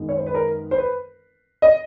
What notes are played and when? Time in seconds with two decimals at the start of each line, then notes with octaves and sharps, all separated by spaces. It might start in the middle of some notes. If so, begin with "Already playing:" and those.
Already playing: F#2 D#3 G#3 B3
0.09 C#5
0.17 C5
0.26 B4
0.35 A#4
0.71 C5
0.78 B4
1.62 D#5